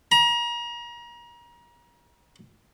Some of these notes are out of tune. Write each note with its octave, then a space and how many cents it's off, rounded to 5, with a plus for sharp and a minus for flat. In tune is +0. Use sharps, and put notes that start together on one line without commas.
A#5 +35